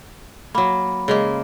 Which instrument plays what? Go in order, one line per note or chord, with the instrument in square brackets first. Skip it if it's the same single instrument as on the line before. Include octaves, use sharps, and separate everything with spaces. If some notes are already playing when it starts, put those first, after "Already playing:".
[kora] F#3 A#3 [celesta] B5
[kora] C#3 G#3 A#3